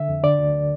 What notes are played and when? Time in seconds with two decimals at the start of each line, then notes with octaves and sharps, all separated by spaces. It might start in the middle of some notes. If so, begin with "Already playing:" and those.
Already playing: D3 E5
0.09 F2
0.23 D3 D5
0.39 D2